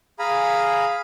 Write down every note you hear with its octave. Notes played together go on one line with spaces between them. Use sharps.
G#4 F5 G#5 A#5 B5